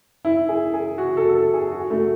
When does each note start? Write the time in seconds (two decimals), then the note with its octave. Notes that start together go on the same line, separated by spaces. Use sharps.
0.25 E4
0.49 G#4
0.74 G#4
0.98 F#4
1.17 A4
1.35 A4
1.54 G#4
1.72 F#4
1.90 A3